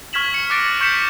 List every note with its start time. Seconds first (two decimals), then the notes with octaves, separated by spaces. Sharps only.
0.13 C#6 F6 G#6 B6 E7 F#7
0.34 C#7
0.50 D6 F6 F#6 A6 A#6 D7
0.81 C#6 G6 B6 C#7 E7